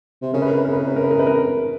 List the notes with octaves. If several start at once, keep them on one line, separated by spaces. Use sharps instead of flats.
C3
C#3 A#4
B4
A#4
B4
A#4
B4
A#4
B4
A#4
B4
A#4
B4
A#4